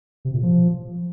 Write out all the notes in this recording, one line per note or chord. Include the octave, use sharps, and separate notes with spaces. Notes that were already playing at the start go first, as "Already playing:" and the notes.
C3
A#2
F3